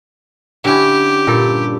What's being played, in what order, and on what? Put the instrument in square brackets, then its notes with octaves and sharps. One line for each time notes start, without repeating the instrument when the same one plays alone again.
[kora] D3 C#4 E4 [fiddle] G4
[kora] G2 A#2 A4